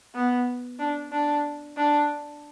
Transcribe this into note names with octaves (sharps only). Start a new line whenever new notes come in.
B3
D4
D4
D4